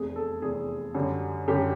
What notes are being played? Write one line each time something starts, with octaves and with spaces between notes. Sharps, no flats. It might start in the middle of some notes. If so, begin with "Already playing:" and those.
Already playing: F1 E2 C3 G#4
A4
F1 E2 C3 G#4
F#2 D3 G3
F#2 D3 G3 G4